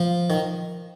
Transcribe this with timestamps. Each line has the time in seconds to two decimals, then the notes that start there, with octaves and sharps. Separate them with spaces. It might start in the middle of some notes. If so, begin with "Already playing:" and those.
Already playing: F3
0.30 D#3